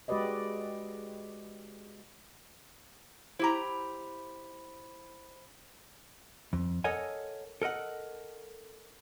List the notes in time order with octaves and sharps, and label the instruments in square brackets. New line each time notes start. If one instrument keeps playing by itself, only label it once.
[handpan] G#3 F#4 G4 B4 D5 D#5
[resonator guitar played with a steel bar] E4 G4 A#5 [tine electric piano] C5 B5
[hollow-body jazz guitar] F2
A4 A#4 C#5 D#5 F#5 G#5
A4 A#4 D#5 F#5